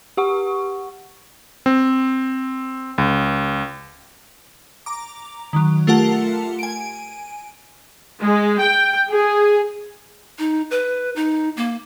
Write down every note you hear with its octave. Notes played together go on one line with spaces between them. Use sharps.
G4 F#5 C#6
C4
C#2
A#5 D6
D#3 F#3
A3 F4 G4 A#4 F#5 A5
G#5 D7
G#3
G5
G#4
D#4
B4
D#4
A#3